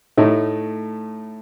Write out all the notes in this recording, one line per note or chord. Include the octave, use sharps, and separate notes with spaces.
A2 A3 D#4